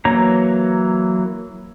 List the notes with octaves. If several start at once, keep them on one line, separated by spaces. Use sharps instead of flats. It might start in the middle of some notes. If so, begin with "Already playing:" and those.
E3 F#3 A#3 C#5 A#5